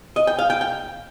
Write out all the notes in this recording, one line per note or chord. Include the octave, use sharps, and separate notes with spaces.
D#5
G5
F5
G5
G5